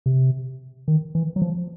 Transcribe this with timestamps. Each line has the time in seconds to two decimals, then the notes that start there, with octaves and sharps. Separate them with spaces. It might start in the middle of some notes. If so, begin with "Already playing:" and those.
0.06 C3
0.88 D#3
1.15 E3
1.36 F#3
1.42 F3